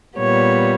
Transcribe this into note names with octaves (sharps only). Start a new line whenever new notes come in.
A#2 G3 B3 C#5